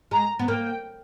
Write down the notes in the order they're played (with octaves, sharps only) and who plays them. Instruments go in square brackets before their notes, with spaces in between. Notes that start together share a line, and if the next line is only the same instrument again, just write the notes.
[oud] G#3 [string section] A#5
[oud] B3
[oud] A#3 [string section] G5